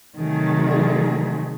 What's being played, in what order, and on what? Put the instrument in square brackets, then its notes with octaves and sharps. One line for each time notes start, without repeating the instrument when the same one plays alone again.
[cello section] C3 D#3 F#3 A3 G#4